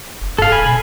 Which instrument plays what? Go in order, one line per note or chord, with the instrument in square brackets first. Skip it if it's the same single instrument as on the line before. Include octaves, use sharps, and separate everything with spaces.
[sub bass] F1
[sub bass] G2 [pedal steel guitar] A4 F5
[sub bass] D#1 [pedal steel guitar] G#5 B5
[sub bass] B2